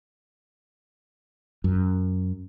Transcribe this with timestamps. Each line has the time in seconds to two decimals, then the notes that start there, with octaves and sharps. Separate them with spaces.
1.64 F#2